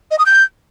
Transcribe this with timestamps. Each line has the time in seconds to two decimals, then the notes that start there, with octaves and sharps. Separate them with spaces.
0.11 D#5
0.18 D#6
0.26 G6